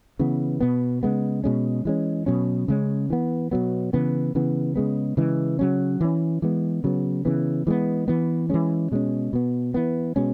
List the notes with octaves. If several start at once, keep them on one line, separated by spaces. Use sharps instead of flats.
C#3 E3 B3
B2 B3
C#3 G#3 B3
B2 G#3 C#4
E3 G#3 C#4
B2 F#3 C#4
C#3 G#3 C#4
E3 B3
B2 F#3 B3
C#3 E3 B3
C#3 E3 B3
C#3 G#3 B3
C#3 E3 G#3
C#3 F#3 C#4
E3 C#4
E3 G#3 B3
C#3 F#3 B3
C#3 E3 B3
E3 G#3 B3
E3 B3
E3 G#3 C#4
B2 G#3 C#4
B2 B3
E3 B3
B2 G#3 C#4